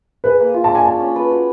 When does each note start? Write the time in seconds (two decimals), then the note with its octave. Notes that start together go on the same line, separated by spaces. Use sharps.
0.24 G#4 B4
0.40 A#3
0.54 F4
0.64 A5
0.70 D4
0.75 G#5
0.85 C#4 A5
1.00 C#4
1.16 B4
1.31 F#4